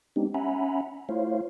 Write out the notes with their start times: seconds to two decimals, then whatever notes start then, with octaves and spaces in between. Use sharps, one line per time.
0.16 G#3 B3 C4 D4 D#4 G4
0.34 C#4 E5 F#5 G#5 A#5 B5
1.09 A3 E4 F4 C5 C#5 F5